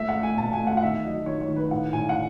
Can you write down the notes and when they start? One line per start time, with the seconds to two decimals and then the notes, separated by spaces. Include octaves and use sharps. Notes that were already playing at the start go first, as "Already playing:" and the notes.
Already playing: A3 E5
0.09 F#5
0.15 A3
0.23 G#5
0.37 B2 A5
0.53 G#5
0.59 A3
0.67 F#5
0.77 F#5
0.83 D#3 E5
1.04 F#3 D#5
1.26 D#3 C#5
1.41 C#5
1.48 D#3
1.56 B4
1.71 A2 F#5
1.93 A2 G#5
2.09 F#5